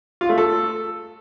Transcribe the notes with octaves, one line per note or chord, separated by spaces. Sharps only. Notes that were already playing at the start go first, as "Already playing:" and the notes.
F4
A3
A4